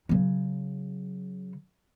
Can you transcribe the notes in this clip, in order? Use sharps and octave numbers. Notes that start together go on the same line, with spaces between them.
C#3 F#3